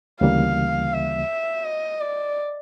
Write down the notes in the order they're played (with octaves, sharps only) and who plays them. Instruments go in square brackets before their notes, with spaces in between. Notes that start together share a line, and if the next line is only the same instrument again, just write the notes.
[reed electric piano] D2 C#3 E3 G3 A#3 [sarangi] F5
[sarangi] E5
D#5
D5